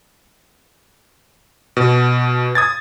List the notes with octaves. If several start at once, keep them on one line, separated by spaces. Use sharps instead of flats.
B2
D#6 G#6 A6